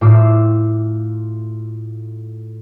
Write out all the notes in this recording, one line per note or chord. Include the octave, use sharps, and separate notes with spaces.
A2 F4 D6 E6 C7